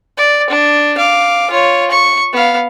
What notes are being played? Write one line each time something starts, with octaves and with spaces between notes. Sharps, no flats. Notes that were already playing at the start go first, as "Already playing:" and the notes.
D5
D4
F5 D6
F4 C#5
C#6
B3 F5